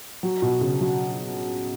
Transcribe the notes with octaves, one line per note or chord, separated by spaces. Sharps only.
F#3
B2
C#3
F#3